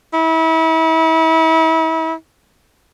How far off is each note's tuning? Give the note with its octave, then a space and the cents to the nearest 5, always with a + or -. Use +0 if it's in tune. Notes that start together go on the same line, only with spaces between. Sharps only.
E4 -35